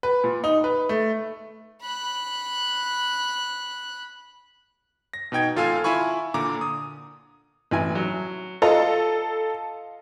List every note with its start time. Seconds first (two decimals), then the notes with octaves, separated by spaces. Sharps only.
0.03 B4
0.24 A#2
0.44 D#4
0.64 B4
0.89 A3
1.82 B5 F#6
5.14 A#6
5.32 B2 D#4 G5 G#6
5.56 G#1 F4 A4 F5 G#5 F6
5.84 E4 F4 G#5 B5 C#6
6.34 A#2 D3 A#5 D6
6.61 D#6
7.71 A1 E4 G#5
7.95 F#3
8.62 F4 A4 D#5 A#5